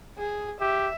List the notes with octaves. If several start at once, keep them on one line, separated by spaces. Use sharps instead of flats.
G#4
G4 E5